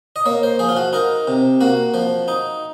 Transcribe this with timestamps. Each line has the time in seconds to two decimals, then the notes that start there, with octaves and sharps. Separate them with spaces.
0.16 D#5
0.26 A#3 C#5
0.43 C5
0.59 F3 G#4
0.69 F4
0.77 F#4
0.93 D#4 A#4
1.27 C3
1.61 A#3 F#4
1.94 F3
2.28 D#4